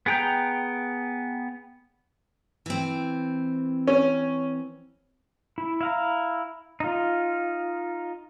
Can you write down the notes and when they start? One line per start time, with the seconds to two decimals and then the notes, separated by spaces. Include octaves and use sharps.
0.06 B3 G#4 G5 A#5 G6
2.66 E3 C4
3.87 C#4
5.58 E4
5.81 E4 F5 A#5
6.80 D#4 F4